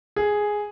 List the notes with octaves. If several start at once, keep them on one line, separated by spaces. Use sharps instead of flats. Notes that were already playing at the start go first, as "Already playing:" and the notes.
G#4